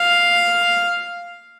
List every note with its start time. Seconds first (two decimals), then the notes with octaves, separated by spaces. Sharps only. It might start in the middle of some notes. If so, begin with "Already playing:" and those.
Already playing: F5